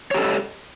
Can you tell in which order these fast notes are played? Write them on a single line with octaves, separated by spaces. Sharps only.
C#5 G4 A4 D#5